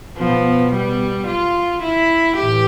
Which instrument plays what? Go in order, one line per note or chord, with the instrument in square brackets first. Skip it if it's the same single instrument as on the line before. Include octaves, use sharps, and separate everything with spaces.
[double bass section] B2 B3 [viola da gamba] F3
[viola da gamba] G3
F4
E4
[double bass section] A2 E3 [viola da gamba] G4